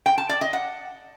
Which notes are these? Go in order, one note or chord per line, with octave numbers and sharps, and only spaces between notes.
G5
A5
D5
D#5
F#5